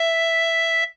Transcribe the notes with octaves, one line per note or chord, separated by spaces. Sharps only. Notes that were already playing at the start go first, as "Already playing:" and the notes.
Already playing: E5